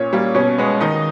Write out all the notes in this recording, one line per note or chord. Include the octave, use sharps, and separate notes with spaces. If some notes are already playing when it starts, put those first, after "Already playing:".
Already playing: A#2 C#4 C#5
G3 A#3
B2 C#4 C#5
G#3 B3
D#3 D#4 D#5